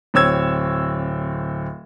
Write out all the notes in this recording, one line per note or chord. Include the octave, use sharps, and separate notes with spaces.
D1 C4 C#5 E6 G#6